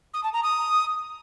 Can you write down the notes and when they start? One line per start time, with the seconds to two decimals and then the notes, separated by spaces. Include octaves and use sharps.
0.14 D#6
0.24 A5
0.33 A#5
0.43 D#6